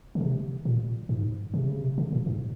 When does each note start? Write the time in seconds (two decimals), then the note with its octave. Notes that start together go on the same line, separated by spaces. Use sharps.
0.15 C#3
0.21 C3
0.65 A#2
1.09 G#2
1.54 C3
1.68 C#3
1.81 C3
1.98 C#3
2.12 A#2
2.27 G#2